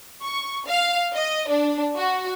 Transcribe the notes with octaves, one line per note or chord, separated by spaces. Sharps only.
C#6
F5
D#5
D4
F#4